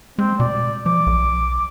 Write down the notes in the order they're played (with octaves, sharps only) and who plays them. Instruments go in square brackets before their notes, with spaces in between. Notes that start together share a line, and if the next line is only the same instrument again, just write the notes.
[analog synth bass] G#3 [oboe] C4
[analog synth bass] B2 [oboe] D5
[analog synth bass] F3 [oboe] D6
[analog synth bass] B1